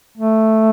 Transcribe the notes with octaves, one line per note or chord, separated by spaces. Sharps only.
A3